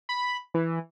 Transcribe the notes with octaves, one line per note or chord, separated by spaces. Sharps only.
B5
E3